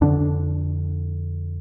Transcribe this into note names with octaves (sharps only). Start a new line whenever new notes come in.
F2 D3 D4